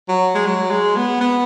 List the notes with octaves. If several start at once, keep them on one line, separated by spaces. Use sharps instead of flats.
F#3
G#3
F#3
G#3
B3
B3